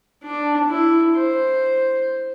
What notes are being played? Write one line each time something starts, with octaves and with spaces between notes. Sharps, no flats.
D4
E4
C5